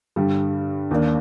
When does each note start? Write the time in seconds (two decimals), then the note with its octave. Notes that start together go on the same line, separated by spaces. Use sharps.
0.16 G2 D3 G3
0.91 D#2 D#3 A#3 D4